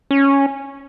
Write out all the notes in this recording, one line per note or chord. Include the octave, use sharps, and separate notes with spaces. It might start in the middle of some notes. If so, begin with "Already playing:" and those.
C#4